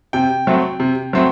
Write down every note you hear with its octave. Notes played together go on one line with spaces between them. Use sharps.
C3 G5
F#3 A3 C4
C3
F#3 A3 C4